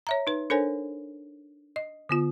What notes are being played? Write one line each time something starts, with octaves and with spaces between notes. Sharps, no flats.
C#5 E5 A#5
D#4 B4
D4 A4 A#4 C5 C#5 G#5
D#5
D3 B3 F4